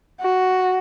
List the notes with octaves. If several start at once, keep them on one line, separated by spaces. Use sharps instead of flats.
F#4